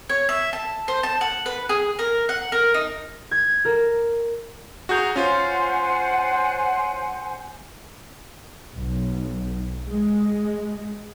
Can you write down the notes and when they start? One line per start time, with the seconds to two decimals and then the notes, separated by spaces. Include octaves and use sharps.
0.09 C#5
0.29 E5
0.53 A5
0.88 C5
1.03 A5
1.21 F#5
1.46 B4
1.69 G#4
1.99 A#4
2.29 F#5
2.52 A#4
2.74 D#4
3.31 G#6
3.65 A#4
4.89 F#4 G#4 A#5 G6
5.16 C#4 F4 C5 F#5 G#5
8.75 B1
9.88 G#3